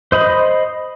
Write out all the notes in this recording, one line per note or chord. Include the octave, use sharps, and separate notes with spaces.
C5 D#5 B5